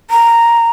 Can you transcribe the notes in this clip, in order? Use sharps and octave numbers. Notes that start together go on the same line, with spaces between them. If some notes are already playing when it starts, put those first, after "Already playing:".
A#5